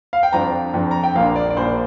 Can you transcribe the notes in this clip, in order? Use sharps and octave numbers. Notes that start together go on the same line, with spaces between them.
F5
G5
F2 F3 D4 A#5
F2 F3 D4
A#5
G5
A#1 A#2 A#3 D4 F5
D5
D5
A#1 A#2 A#3 D4 C5